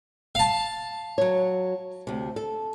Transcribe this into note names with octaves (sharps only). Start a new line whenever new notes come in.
F5 A5
F#3 C#5
D2 C3
A4